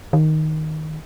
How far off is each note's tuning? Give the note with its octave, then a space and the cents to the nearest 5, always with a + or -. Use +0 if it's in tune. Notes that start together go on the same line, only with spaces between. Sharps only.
D#3 +0